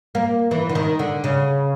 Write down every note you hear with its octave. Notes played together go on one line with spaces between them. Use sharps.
A#3
E3
D3
D#3
D3
C#3